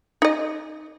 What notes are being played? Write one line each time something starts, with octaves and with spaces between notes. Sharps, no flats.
D#4 D#5